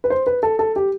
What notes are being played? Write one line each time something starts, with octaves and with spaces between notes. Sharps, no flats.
B4
C5
B4
A4
A4
G4